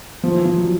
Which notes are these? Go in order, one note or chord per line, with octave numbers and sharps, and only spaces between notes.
F3
E3
F3
F#3